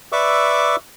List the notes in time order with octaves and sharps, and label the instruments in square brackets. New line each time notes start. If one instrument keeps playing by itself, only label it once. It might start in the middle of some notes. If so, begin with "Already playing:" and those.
[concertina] B4 D5 E5 C#6 D6 E6